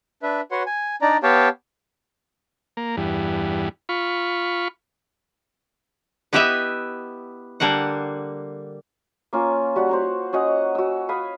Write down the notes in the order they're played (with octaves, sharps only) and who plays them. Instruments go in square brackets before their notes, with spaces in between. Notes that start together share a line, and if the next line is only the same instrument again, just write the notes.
[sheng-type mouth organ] D4 B4 E5
F#4 B4 C#5 F#5 C6
G#5
D4 D#4 D5 A#5
B3 G4 C#5 F5 G5 A5
[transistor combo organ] A#3
E2 G2
F4 B5 C#6
[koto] B3 E4 G4 B4 D#5 E5
D3 G3 A#3 F#5
[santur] A#3 C#4 F4
G3 F#4 F#5
C5 F#5 A#5
C#4 F#4 D#5 F#5
F#4 E6
F5 G#5 B5 D#6